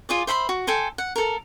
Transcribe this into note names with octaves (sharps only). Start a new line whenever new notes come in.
F4 G#4 D5
C5 E5 B5 C6
F#4
A4 G5 G#5 C6
F#5
A4 A#4